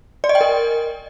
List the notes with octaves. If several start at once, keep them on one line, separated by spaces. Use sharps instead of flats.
D5
D#5
G5
A#4